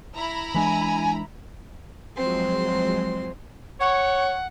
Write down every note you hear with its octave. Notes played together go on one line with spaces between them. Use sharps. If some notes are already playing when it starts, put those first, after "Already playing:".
E4 A#5 B5
E3 G#3 D4 G#5
F3 F#3 G#3 C4 C6
C#5 F#5